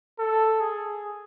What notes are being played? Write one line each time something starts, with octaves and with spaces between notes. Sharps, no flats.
A4
G#4